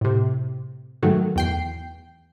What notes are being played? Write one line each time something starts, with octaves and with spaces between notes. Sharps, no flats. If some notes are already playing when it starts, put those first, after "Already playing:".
A2 C3
G#2 D#3 F#3 A3
E2 G5 C7